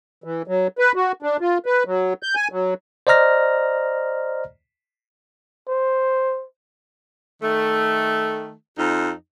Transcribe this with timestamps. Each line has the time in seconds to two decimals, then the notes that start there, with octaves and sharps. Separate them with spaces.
0.24 E3
0.47 F#3
0.79 B4
0.95 F#4
1.22 D4
1.41 F4
1.66 B4
1.86 F#3
2.23 G6
2.35 G#5
2.52 F#3
3.07 C5 D5 D#5 A#5 F6 A#6
5.68 C5
7.42 D#3 A3
8.78 F2 D#4